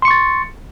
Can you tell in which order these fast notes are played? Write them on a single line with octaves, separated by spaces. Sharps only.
C6 C#7 C#6 A6